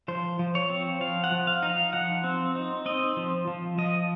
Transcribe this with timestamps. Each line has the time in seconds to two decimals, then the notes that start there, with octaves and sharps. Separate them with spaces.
0.08 F3 C5
0.39 F3
0.55 C#5
0.70 C4
1.01 F3 F5
1.24 F#5
1.32 F3
1.47 F5
1.63 D#4
1.70 F5
1.93 F3 F#5
2.24 C4
2.55 D#4
2.86 C4 D#5
3.17 F3
3.47 F3
3.78 F3 D#5